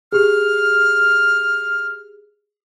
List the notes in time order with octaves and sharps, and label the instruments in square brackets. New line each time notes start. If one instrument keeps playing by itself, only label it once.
[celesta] G4 G#4 [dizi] F6